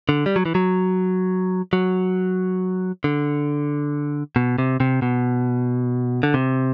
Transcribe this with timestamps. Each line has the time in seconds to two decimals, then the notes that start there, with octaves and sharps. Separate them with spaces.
0.09 D3
0.26 G3
0.36 F#3
0.46 E3
0.55 F#3
1.73 F#3
3.04 D3
4.36 B2
4.58 C3
4.80 C3
5.02 B2
6.23 D3
6.34 C3